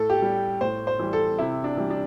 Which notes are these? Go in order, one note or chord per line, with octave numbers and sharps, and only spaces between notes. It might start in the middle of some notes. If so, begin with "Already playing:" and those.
Already playing: A2 A4
G4
G3
A2 C5
C5
E3 G3
A4
C3 E4
D4
E3 G3
D4